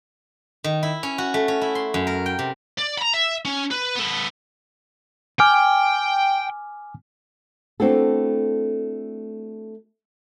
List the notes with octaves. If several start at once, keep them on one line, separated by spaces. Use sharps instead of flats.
D#3
E4
C#4
F#4
A3
C#4
E4
C6
F#2
A#4
G5
C3
D5
A#5 B5
E5
C#4
B4
B3 A4
G5 G#5 D6 F6
A3 C4 D4 E4 F#4 A4